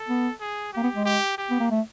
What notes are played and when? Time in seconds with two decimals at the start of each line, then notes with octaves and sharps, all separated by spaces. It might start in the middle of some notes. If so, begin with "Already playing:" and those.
Already playing: A4
0.09 B3
0.40 G#4
0.73 A#3 G4
0.83 B3
0.94 G#3
1.05 G4
1.38 G4
1.50 B3
1.60 A#3
1.71 A3